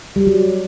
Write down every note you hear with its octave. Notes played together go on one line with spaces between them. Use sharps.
G3
F#3